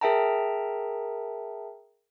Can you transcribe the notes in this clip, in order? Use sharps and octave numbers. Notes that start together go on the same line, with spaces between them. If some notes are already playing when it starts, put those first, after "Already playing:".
G#4 A#4 E5 G5 A5 A#5